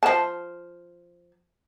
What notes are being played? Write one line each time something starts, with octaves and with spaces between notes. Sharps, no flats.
F3 A5